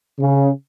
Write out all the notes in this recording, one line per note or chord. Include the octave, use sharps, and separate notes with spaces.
C#3